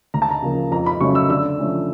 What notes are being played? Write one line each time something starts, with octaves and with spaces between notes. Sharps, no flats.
D2 A#5
A5
A#5
C#3 F3 A#3
F2 A#5
B5
C#3 F#3 A3 C#4 C#6
E6
D3 E6
F3 A3 C#4